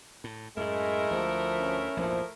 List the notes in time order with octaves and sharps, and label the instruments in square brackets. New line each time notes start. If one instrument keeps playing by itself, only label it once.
[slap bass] A2
[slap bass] F#2 A2 [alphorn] G#3 [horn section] A3 E4 A#4
[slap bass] D2 [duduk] F3
[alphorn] C#4
[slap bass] A#1 E2 G#2 [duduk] F3